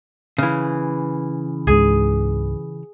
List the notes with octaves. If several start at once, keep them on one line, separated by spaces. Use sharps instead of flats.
C#3 E3
C#2 G#2 G#4